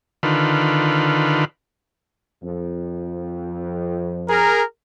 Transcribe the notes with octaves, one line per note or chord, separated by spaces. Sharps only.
D3 D#3 F4 B4
F2
G#4 A#4